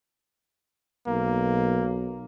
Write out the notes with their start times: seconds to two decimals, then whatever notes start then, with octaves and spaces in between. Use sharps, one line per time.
1.07 B1 A#3